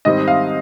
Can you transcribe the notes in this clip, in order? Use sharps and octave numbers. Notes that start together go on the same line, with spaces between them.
G#2 D#3 G3 C4 D#5
F5